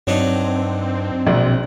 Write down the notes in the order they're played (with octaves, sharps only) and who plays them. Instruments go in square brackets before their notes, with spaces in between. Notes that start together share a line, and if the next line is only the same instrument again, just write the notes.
[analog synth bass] G2 [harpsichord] F#3 D4 D#4 [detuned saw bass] C4
[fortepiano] A#1 [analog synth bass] B2